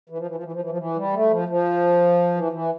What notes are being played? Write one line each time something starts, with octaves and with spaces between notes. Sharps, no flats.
E3
F3
E3
F3
E3
F3
E3
F3
E3
G3
A3
F3
F3
E3
E3